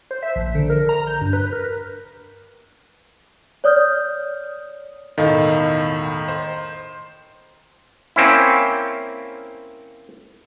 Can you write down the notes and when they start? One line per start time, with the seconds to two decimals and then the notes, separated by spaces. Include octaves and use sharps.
0.11 C5
0.23 E5
0.36 A#1
0.55 D3
0.70 A#4
0.89 A#5
1.07 G6
1.21 G2
1.33 B4
1.53 A#4
3.64 C#5 D5 D#6 F6 G6
5.18 E1 A2 D#3 A4 D#5 F5
6.28 C5
8.16 A#3 C4 C#4 E4